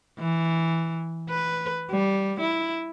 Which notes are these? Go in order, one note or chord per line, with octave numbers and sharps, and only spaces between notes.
E3
B4
G3
E4